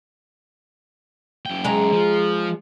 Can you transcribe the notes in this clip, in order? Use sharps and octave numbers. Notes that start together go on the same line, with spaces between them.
F#2 G5
G#3 A#5
F3